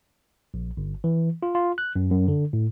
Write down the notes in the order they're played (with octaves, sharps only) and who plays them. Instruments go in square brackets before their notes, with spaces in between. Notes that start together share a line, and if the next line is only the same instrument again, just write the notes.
[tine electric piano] A#1
G1
E3
F4
F4
F#6
F#2
F#2
D3
A2